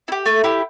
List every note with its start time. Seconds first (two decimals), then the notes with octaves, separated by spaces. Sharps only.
0.08 E4
0.12 G4
0.26 A3
0.44 E4 G4